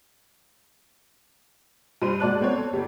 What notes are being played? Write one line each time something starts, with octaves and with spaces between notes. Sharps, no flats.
G2 C5 D#7
G#2 F#4 D5 A5 F#6
B3 C4 C#5
A4
G1 G3